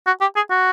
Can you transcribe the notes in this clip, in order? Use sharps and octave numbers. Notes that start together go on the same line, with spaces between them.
F#4
G4
G#4
F#4